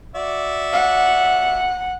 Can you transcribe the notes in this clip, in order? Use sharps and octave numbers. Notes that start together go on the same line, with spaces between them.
F#4 D5 E5
F#5